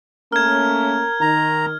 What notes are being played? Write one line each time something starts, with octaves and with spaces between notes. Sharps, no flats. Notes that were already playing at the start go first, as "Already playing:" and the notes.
A3 A#3 C#4 A#4 F6 G#6
D#3 A#5